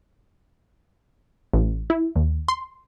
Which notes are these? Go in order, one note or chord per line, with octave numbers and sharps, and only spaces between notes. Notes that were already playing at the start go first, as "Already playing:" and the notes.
A1
E4
D#2
C6